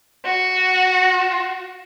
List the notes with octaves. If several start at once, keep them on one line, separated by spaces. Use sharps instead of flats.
F#4